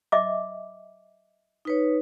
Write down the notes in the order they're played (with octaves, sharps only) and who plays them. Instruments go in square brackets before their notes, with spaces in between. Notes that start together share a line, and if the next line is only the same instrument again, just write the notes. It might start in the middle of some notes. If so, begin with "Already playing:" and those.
[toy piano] D#5 E5 D6
[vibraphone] D#4 B4 C#5